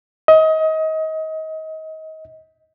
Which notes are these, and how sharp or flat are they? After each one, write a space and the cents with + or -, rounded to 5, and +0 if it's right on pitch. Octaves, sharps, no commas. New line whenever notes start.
D#5 +30